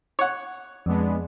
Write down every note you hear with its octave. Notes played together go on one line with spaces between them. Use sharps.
C#5 F#5
F2 G#3 B3 D4